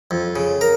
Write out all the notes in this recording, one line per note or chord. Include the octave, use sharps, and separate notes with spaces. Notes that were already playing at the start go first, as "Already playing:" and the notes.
F2
C#3
A#4